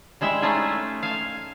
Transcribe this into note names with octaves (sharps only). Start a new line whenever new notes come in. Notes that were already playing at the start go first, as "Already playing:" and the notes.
G3 G#3 E4 E5
A3 C#4 D#4 F4 G#4
F5 G#5 A5